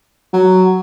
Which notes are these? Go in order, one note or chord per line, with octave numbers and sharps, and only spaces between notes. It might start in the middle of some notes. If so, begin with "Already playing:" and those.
F#3